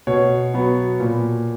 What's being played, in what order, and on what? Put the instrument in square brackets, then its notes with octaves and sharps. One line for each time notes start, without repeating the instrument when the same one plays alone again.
[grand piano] B2 C#5
F#3 B3
A#2